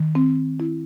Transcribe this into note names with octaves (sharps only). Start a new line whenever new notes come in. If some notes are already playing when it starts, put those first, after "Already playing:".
Already playing: D#3
C4
E4